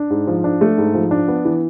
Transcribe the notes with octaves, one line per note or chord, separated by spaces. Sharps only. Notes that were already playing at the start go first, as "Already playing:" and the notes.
Already playing: D4
G#2
F3
D4
A3
G#2
F3
D4
B3
E3